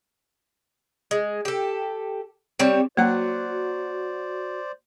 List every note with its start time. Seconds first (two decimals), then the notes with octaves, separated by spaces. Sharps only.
1.11 G#3
1.45 G4 A4
2.59 G3 C4 C#5
2.97 F#3 A#3 F#4 C5 D5 F#5